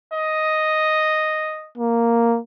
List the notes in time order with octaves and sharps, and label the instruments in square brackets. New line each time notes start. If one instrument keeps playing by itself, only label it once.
[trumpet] D#5
[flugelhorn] A#3